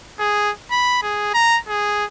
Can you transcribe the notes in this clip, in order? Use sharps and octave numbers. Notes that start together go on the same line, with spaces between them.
G#4
B5
G#4
A#5
G#4